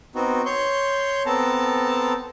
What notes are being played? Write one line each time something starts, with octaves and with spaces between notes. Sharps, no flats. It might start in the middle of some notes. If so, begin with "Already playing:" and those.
B3 C4 D#4 F#4
C#5 C6 C#6 G6
B3 C4 A4 A5 A#5